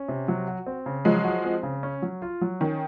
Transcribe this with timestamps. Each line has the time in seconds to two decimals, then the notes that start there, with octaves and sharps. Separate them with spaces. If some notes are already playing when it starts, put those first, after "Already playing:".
Already playing: C#4
0.08 C3
0.28 F#3
0.48 F#4
0.66 C4
0.86 C#3
1.05 F3 F#3 G#3
1.25 F#4
1.44 C4
1.63 C#3
1.83 C#4
2.02 F#3
2.22 F4
2.41 F#3
2.61 D#3 C#4